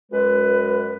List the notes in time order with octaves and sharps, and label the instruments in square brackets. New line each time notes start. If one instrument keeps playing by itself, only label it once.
[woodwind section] F#2 G#3 B4